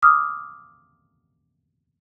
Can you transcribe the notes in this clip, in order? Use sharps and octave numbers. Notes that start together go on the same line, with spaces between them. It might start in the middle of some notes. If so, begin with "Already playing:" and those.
D6 D#6 F6